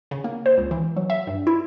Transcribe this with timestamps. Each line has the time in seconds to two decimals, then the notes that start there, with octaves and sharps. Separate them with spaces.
0.11 C#3
0.24 A#3
0.46 C5
0.58 C#2
0.71 E3
0.97 F#3
1.10 E5
1.27 G2
1.47 E4